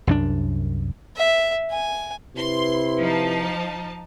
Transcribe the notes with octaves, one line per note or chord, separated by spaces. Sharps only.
C2 F#2 F3 D4
E5
G#5
C3 E4 B4 C6
F3 D#4 A5